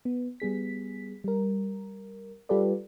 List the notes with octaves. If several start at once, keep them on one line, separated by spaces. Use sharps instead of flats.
B3
G3 B3 G#4 B6
G3 A#4
G3 F4 G4 A4 B4 D5